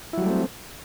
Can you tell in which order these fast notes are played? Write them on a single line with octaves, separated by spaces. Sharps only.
E4 F#3 G3 A3 C4